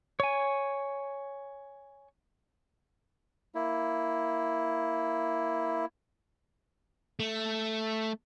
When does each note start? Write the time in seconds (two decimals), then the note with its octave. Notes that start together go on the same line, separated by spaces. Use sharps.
0.20 C#5 G#5
3.55 A#3 E4
7.19 A3